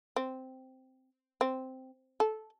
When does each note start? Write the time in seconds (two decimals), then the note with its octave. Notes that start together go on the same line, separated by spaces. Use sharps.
0.16 C4
1.41 C4
2.20 A4